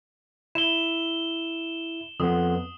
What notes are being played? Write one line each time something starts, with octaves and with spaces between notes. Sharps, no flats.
E4 E7 G7
F2 B3 D#6